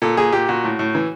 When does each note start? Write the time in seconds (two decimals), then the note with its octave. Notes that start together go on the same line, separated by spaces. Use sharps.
0.02 A#2 A4
0.17 A#2 G#4
0.33 A#2 G4
0.48 A#2 F#4
0.64 A2
0.79 A2
0.95 E3